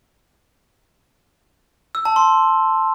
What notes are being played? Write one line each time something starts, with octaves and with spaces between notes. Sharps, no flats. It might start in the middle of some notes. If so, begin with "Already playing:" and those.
E6
A5
C6